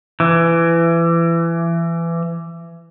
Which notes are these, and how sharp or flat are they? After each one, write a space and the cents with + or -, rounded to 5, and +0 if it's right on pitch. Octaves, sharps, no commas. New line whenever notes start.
E3 +25